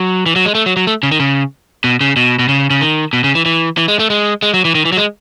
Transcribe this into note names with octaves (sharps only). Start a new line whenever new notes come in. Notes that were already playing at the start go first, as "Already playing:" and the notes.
Already playing: F#3
E3
F#3
G#3
A3
F#3
F#3
A3
C#3
D#3
C#3
B2
C#3
B2
B2
C#3
C#3
D#3
B2
C#3
E3
E3
E3
G#3
A3
G#3
G#3
F#3
E3
D#3
E3
F#3
G#3